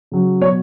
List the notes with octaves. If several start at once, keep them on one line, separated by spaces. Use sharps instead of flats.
C#3 F#3
B2 F#3 C#5